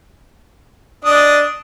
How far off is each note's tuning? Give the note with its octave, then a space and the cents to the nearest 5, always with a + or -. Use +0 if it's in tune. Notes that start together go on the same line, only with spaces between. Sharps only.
D4 +0 D#5 +0 D#6 +0